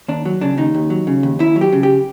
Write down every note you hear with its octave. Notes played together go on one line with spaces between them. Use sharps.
D#2 D4
F#3
C#3 D4
D#2 D#4
D#2
F#3
C#3
D#2
D#2 E4
F#3
G4
C#3
G4